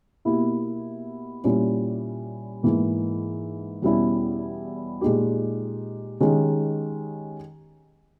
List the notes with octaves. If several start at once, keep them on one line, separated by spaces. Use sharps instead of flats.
B2 A#3 E4 G4
A#2 G3 C#4 E4 G4
G#2 E3 A#3
E2 B2 G3 C#4 E4
A#2 G#3 D#4 G4
D#3 G#3 C#4 G4